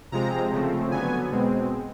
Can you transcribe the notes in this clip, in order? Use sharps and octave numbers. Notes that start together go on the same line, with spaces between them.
C3 F3 G#3 C4 A#5
C#3 F3 A3 C4
D3 F#3 B3 G#5
B2 G#3 C4